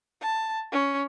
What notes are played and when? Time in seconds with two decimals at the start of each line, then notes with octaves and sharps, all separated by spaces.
0.21 A5
0.72 C#4